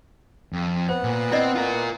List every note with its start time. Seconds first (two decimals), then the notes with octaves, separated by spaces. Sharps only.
0.53 F2
0.89 B3 C5 F#5
1.04 A#2
1.32 C4 E4 D5 D#5
1.55 F4 A#4